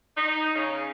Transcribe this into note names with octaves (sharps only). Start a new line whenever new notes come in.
D#4
C#3